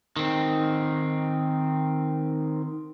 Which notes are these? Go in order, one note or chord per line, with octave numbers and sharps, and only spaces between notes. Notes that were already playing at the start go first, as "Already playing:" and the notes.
D#3 C4